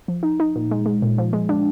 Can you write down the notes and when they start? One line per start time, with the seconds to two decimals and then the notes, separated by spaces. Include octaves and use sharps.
0.08 F3
0.23 D#4
0.40 D#4
0.55 A#2
0.71 G#3
0.86 G#3
1.02 A#2
1.18 F3
1.33 G#3
1.49 D4